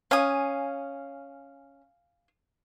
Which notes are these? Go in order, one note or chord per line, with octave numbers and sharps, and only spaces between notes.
C#4 F5 G#5 D#6